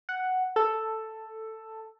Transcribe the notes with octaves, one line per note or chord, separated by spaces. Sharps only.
F#5
A4